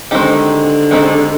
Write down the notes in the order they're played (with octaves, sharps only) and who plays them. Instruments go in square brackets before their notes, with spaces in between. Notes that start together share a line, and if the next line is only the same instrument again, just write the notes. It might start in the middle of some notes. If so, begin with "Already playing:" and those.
[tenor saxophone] D3 [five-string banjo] D#3 G#3 C4 D#4 G4
[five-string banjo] D#3 G#3 C4 D#4 G4